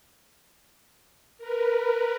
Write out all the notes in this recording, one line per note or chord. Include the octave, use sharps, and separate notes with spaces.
A#4 B4